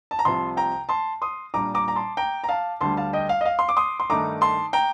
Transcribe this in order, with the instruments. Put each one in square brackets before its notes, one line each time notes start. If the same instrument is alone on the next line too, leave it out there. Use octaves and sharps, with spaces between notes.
[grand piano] A5
A#5
C2 C3 F3 A5 C6
G5 A#5
A5 C6
C6 D#6
A#2 G3 D4 A#5 D6
A#5 D6
A#5
A5 C6
G5 A#5
A#5
F5 A5
D2 D3 G3 A5 C6
F5 A5
D#5 G5
F5
D#5
F5
C6
D6
C6 D#6
C6
G2 D#3 A3 D#4 A#5 D6
A5 C6
G5 A#5